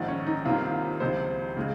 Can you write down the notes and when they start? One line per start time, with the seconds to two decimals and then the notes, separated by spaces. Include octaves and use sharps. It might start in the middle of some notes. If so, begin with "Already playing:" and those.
Already playing: A#1 G#2 D#3
0.08 C#4
0.27 D#4
0.45 C2 C3 D#3 A#3 F4
1.00 C#2 C3 F3 C5
1.57 C#3 G#3